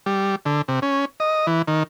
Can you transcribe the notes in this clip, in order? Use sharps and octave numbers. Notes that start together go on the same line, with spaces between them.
G3
D3
C3
C#4
D#5
E3
D#3